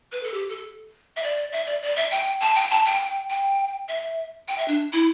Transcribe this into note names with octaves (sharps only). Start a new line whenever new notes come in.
B4
A4
G4
A4
E5
D5
E5
D5
D5
E5
G5
A5
G5
A5
G5
G5
E5
G5
E5
D4
E4